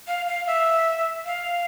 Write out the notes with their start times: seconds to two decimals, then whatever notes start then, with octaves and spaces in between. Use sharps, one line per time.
0.07 F5
0.28 F5
0.47 E5
1.26 F5